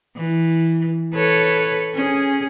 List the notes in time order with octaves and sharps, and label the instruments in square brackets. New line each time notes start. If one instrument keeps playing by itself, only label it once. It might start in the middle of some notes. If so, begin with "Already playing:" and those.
[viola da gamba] E3
A4 B4 C#5
C#4 G#4